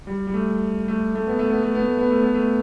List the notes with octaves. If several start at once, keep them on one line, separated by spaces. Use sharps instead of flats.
G3
G3
A3
A3
A3
B3
A3
B3
A3
B3
A3
B3
A3
B3
A3